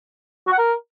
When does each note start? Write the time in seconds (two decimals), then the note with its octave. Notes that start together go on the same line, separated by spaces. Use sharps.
0.47 F#4
0.53 F#5
0.58 A#4